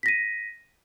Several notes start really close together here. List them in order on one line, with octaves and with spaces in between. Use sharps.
B6 A#6 D#7